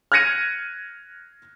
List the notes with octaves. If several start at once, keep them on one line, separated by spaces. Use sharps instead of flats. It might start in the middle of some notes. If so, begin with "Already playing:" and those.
F6 F#6 G#6 A#6 C#7 D#7